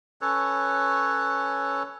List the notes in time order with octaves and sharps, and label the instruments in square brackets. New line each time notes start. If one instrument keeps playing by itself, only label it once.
[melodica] C#4 A4 B4 C#5